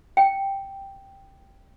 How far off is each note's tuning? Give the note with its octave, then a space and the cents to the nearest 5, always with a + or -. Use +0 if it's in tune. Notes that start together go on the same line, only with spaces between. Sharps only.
G5 +0